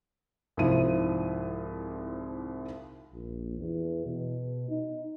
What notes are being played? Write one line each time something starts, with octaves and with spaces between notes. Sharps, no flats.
C2 G#2 F3 E4 D#7
A#1
E2
B2
D#4